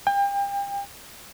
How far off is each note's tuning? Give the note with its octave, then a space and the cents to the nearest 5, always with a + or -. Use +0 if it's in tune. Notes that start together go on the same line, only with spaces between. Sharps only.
G5 +35